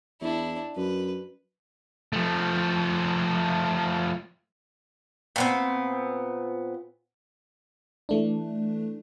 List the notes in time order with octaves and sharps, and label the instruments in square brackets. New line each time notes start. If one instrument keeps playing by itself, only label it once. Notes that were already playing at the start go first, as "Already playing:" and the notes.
[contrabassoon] E2 [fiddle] D4 E4
[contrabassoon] F#2 [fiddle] B4
[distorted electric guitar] F3 A3
[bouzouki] A#2 B3 C4
[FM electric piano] E3 A3 D4